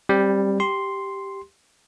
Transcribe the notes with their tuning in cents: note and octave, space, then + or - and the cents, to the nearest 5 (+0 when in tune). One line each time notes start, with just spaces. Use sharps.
G3 +5 C4 +30
G4 +0 C6 +0